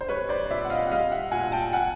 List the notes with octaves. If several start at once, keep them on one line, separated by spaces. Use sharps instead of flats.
C5
G3 B4 C#5
C5 D5
A#2 D5 E5
F#5
D#5 F5
F#5
G3 D#5 F5
E5 F#5
A#2 F#5 G#5
G5 A5
F#5 G#5